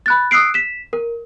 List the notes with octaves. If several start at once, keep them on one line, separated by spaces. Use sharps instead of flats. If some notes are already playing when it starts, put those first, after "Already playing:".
B5 F#6 A6
D#6 E6 F#6 C7 D7
B6 E7
A#4